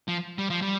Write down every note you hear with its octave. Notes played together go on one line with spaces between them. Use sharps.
F3
G3
F3
G3